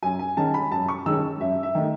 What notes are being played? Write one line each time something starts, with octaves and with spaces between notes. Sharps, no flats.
F#2 G#5
G#5
D#3 G#3 C#4 A5
B5
F#2 A5
C#6
D#3 G#3 C#4 E6
F#2 E5
E5
D#3 A3 D#4